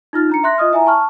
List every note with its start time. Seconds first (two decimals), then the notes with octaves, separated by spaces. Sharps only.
0.13 D#4 F4 F6 A6
0.29 D4 A#5 C#7
0.43 E5 C6 F#6 A#6
0.58 F4 D#5 D#6 F6
0.72 E4 E5 G#5 A#5
0.86 A5 C#6 F6